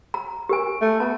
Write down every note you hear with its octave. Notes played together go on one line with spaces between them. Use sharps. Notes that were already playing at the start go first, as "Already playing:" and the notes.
A#5
G4 A#4 G#5
A3
B3 A5 A#5